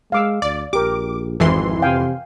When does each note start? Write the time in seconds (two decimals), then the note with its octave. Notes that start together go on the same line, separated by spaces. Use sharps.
0.12 G#3 F5 D6 E6
0.42 D2 D5
0.73 A#1 G4 A#4 D6
1.40 G#1 F2 E3 C6
1.82 C3 F5 G5 G#5